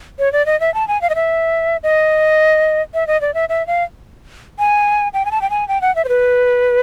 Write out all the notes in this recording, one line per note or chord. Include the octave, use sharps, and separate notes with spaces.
C#5
D5
D#5
E5
A5
G#5
F5
D#5
E5
D#5
E5
D#5
D5
E5
E5
F5
G#5
G5
G#5
A5
G5
G#5
G5
F#5
E5
C5
B4